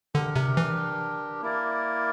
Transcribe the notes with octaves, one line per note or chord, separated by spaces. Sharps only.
D3 D4 G4 A#4
C3
E3
A#3 E4 A#4 D5